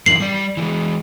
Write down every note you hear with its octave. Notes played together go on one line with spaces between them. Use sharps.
F#2 E3 D4 C7 F#7
G3 D5
E3 G3 G#3